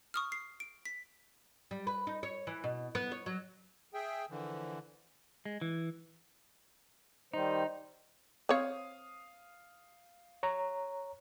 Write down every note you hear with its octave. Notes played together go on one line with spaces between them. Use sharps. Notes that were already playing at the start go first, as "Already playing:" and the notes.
C#6 D#6 F6
C7
D7
B6
G3
B4
D#4
C#5
E3
B2
B3
C#5
F#3
G#4 E5 G5
D3 E3 F3 A#3
G#3
E3
D#3 G3 D#4 C5
C4 C#5 F5 D#6
C#5 A#5